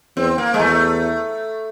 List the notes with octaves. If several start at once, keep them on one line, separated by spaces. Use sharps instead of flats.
E2 C4
A#3
G#3
E2 A3